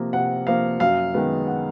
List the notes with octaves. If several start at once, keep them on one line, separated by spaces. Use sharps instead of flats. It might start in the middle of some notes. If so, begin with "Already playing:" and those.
Already playing: C3 F3 A#3
C3 F#5
F3 A#3 F5
F#2 F5
D#3 G#3 B3
F#5